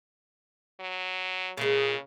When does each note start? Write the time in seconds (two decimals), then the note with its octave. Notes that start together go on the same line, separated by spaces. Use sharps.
0.80 F#3
1.57 A#2 C#3 G#3